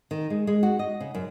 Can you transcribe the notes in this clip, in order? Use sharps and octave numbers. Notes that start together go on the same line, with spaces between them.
D#3
G#3
G#3
F#4
D#5
C#3
F#2